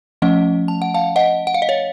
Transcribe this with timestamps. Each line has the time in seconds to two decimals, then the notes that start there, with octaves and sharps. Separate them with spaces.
0.22 F3 A3 C#4 D#5 F#5
0.68 A5
0.82 F#5
0.94 F5 A5
1.16 D#5 F#5
1.47 F#5
1.54 F5
1.62 D#5
1.69 C#5 F5